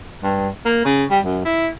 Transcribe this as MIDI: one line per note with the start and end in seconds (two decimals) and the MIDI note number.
0.23 0.49 43
0.65 0.81 58
0.85 1.05 49
1.10 1.19 55
1.24 1.44 42
1.45 1.68 64